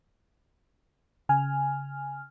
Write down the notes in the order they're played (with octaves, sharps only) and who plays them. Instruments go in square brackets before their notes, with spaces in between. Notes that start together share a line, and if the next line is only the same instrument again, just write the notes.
[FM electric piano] C#3 G#5 F6